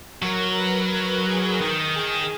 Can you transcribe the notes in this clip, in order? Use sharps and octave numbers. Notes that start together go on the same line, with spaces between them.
F#3 A#4
B4
A#4
G#4
D#3 A#4
G#4